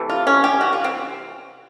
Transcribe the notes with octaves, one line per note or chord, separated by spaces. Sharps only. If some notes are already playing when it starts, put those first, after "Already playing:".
Already playing: C3 E3 A3
F4
C#4
G4
F#4
F4
C4